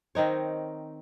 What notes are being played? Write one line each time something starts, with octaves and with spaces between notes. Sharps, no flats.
D#3 C4 D#4 C#5